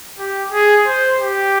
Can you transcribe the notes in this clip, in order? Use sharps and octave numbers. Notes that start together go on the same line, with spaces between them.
G4
G#4
C5
G4